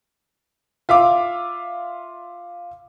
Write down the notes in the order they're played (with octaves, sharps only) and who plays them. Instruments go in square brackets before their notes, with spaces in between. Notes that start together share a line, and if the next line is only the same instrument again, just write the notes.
[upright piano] F4 E5 F5 D6